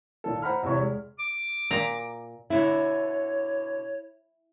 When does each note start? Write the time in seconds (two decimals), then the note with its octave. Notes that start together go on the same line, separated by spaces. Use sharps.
0.24 A#2 D#3 A4
0.42 C5 F#5 A#5 B5 F6
0.63 E2 C3 E3 E4 C#5 C#6
0.78 G#3
1.19 D6
1.71 A#2 A#5
2.50 B2 D3 E4 C#5 E5